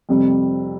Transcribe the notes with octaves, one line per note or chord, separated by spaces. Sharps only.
F2 C3 G3